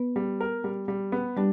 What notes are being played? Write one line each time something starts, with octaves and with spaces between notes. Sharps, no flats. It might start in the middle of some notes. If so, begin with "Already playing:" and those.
Already playing: B3 B4
G3
A#4
G3
G3
B3
G3 D4 G4